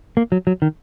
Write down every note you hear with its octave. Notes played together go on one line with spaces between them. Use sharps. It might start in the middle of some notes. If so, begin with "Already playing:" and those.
A#3
F#3
F#3
D#3